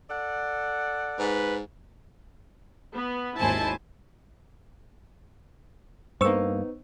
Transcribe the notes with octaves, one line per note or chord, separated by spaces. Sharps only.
A4 D5 F#5
G#2 B4
B3
G#1 D#2 E4 C5 G#5 A5
G2 A#3 B3 D#4 C5 C#6 E6